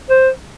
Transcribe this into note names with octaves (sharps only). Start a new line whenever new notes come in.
C5